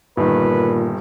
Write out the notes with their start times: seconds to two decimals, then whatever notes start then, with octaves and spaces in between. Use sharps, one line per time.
0.17 G1 A#2 D#3 B4